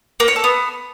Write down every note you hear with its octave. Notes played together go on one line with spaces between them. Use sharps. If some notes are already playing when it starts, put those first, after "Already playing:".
A#3
C#5
A4
B3